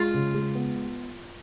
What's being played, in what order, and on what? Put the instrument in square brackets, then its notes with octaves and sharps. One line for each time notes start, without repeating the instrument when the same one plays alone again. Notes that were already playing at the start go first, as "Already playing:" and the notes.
Already playing: [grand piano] G#3 [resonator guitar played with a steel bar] F4
[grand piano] C#3
G#3
B3